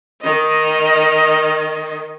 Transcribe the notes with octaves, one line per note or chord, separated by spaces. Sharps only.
D#3 D#5